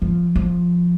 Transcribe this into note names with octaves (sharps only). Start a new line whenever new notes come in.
F3
F3